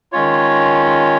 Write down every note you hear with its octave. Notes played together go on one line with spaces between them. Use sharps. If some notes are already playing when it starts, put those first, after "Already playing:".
D#3 G#3 C#4 F4 C#5